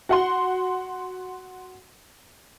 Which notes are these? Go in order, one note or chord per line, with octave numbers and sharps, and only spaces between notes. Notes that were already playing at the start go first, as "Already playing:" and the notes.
F#4 F#5 C6